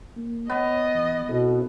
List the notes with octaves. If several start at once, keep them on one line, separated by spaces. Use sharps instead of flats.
A#3
B3 C#5 D#5
E3
B2 C4 E4 A4